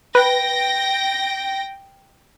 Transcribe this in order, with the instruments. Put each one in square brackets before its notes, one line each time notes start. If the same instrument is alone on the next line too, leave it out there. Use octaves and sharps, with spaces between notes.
[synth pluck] B4 [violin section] G5 A#6